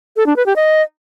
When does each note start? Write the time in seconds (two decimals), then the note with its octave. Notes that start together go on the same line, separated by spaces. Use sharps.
0.17 A4
0.27 D4
0.36 B4
0.46 G4
0.56 D#5